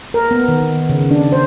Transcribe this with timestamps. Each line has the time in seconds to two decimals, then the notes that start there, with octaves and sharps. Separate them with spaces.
0.14 A#4
0.31 B3
0.48 D#3
0.89 C#3
1.11 D4
1.32 C5